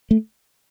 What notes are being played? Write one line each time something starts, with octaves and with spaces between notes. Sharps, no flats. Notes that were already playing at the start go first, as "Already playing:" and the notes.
A3